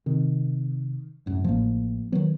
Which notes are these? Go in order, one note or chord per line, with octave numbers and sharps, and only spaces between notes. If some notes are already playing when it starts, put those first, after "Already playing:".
C3 D#3
C2 F#2 A2
A1 A2 F3 A#3
D#3 F#3 B3